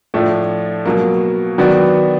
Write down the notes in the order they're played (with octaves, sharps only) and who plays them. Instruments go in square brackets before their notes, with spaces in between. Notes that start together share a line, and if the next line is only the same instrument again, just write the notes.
[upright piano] A2 F3 A3 D4
B2 F#3 A#3
D#3 F#3 B3 D4 F#4